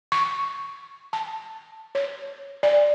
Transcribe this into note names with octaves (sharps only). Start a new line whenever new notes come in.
C#6
A5
C#5
D5